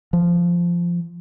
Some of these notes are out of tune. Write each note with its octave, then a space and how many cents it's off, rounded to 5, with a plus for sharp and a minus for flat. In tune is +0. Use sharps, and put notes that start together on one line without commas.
F3 -10